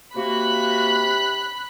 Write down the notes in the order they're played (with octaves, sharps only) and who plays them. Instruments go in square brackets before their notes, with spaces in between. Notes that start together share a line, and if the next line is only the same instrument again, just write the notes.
[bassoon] C3 [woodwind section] A#3 F#4 [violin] B5 F#6